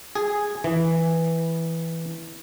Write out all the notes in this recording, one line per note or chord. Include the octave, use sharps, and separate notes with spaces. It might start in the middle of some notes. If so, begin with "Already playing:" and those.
G#4
E3